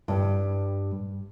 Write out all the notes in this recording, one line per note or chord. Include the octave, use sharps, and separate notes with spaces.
G2 G3